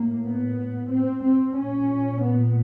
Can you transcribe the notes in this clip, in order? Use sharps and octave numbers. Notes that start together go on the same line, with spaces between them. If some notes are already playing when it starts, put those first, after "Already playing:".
Already playing: A2 A#3
B3
C4
C4
A#2 C#4
B3